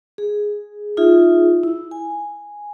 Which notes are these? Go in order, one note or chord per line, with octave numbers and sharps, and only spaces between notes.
G#4
D#4 F4 G#4 E5
E4
G#5